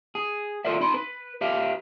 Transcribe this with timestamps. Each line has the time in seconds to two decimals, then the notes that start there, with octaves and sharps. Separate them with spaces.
0.15 G#4
0.65 F4 A4 A#4 D5 E5
0.81 D#4 B5 C6
0.94 B4
1.41 G4 B4 E5 F5